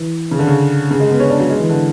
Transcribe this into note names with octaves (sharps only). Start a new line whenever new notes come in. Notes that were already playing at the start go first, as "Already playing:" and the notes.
Already playing: E3
C#3
D3
C#3
C#3
G#3
B3
C#4
D4
F#3
G#3
E3
D3